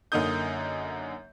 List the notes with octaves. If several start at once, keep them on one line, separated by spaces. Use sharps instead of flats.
F#2 D3 A#3 D#4 D#6 G6